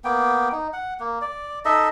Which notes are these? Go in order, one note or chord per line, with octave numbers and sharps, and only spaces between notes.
A#3 B3 G5
D#4
F#5
A#3
D5
D#4 A4 D#5 E5